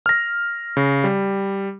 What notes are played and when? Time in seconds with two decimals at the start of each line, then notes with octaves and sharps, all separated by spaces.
0.06 F6 A#6
0.77 C#3
1.04 G3